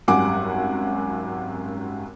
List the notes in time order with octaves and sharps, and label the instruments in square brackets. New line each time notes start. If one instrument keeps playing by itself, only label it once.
[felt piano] G#1 F#2 G3 F#5 G#5 D6